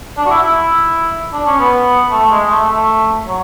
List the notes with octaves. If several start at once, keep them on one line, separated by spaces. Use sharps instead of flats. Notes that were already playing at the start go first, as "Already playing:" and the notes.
D4
F#4
E4
E4
D4
C#4
B3
A3
G#3
A3
A3
F#3